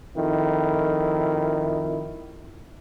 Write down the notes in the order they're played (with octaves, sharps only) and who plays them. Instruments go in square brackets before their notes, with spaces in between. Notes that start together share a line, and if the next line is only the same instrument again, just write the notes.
[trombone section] F2 D#3 E4